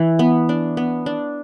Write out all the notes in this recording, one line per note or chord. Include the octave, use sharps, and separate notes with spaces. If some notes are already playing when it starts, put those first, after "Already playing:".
Already playing: E3
B3
D4
B3
D4